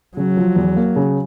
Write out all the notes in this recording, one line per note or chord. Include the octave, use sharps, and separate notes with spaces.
C#3 F#3
F3
E2
A#3
C#3